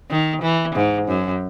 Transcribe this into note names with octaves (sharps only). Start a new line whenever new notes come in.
D#3
E3
G#2
F#2